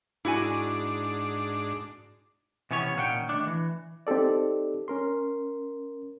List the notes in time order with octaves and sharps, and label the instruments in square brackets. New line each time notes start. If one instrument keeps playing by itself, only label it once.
[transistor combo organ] G#2 D4 [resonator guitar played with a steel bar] E4 F#4 G#5
[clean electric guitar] C3 E3 B3 C#4 C#5
A#2 D#3 C#4 G#4 F#5 G5
D#3 A3 D4
E3
[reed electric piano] C4 D#4 G4 A4 D5
C#4 A#4 C6